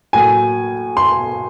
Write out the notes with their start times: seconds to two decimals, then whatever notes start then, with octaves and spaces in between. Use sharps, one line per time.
0.13 A2 F#3 A#3 G#5
0.97 C6